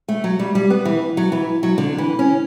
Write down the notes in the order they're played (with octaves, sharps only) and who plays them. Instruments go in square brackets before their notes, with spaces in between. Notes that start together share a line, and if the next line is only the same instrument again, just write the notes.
[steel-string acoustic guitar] A3
F#3
G3
G3
B3
E3
F#3
E3
F#3
D3
E3
C#4